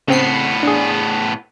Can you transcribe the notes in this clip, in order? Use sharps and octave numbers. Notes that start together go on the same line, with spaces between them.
A2 C#3 B3 C4 C7
D4 G#4